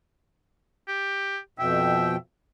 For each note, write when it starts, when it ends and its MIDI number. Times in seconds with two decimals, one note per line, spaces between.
0.88 1.38 67
1.59 2.16 41
1.59 2.16 47
1.59 2.15 76
1.59 2.16 79